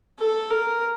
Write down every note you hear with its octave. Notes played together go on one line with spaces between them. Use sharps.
A4
A#4